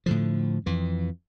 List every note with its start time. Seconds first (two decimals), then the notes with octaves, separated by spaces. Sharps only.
0.06 A2 D3 F3
0.66 F2 E3